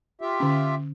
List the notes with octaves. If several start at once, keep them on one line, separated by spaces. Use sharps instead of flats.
F4 G4 E5
D3 C#4